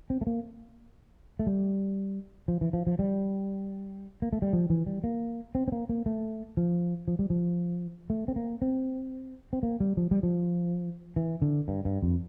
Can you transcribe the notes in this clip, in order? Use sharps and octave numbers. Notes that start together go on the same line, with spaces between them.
C4
A3
A#3
A3
G3
F3
E3
F3
F3
G3
A#3
A3
G3
F3
E3
G3
A#3
C4
C4
A#3
A#3
A3
F3
F3
G3
F3
A3
C4
A#3
C4
C4
A#3
G3
F3
G3
F3
E3
D3
G2
G2
F2